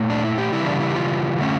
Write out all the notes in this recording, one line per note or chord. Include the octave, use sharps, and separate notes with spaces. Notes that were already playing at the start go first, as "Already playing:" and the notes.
Already playing: A#2 A3
D4
E4
G4
C#3 E3 G3 A#3 E4
D4
E4
G4
F4
D3 A3 C#4